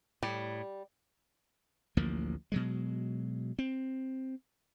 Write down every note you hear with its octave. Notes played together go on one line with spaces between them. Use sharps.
A2 G3
A1 D2 F3 A#3
B2 F#3 G#3
C4